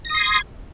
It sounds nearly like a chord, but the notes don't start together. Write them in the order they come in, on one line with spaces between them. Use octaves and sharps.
A#6 D#6 C6 G#6